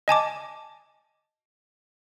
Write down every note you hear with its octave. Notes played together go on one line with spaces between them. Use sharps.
D#5 G#5 A5 D6